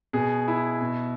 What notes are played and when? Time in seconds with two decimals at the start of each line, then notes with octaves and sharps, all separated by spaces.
0.13 B2 G#4
0.48 E4
0.81 B2